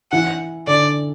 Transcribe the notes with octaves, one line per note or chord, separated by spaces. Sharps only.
E3 F#5
D3 D5